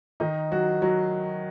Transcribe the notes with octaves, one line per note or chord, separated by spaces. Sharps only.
D#3 D#4
F#3 F#4
F#3 F#4